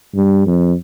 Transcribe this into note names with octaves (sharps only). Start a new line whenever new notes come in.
G2
F2